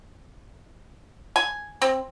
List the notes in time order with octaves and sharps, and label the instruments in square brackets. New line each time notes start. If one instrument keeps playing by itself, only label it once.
[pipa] G#5
C4